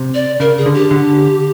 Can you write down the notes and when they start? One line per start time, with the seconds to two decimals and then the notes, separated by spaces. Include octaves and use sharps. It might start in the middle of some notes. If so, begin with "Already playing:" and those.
Already playing: C3
0.14 D5
0.40 C#3 A#4
0.57 G#4
0.66 D3
0.74 G4
0.91 D3